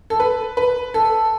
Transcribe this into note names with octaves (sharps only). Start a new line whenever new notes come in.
A4
B4
B4
A4